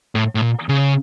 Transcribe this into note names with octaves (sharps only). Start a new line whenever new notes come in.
A2
A2
A#2
C#3